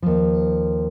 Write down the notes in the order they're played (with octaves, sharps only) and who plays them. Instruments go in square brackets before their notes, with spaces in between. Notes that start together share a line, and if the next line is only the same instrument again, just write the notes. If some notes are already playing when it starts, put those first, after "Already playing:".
[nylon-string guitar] D#2 F3